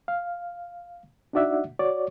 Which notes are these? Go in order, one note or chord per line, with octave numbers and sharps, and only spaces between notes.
F5
D4 D#4 F#4 D5 E5 F#5
F#4 C#5 D5